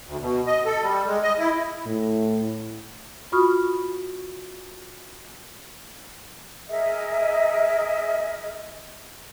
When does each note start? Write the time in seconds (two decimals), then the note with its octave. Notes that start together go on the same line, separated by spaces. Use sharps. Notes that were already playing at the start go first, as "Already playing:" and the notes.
0.07 D2
0.20 B2
0.47 D#5
0.65 A4
0.82 G3
1.07 G#3
1.23 D#5
1.39 E4
1.86 A2
3.32 F4 F#4 B5 C#6 D#6 F6
6.69 G#4 A#4 D#5 E5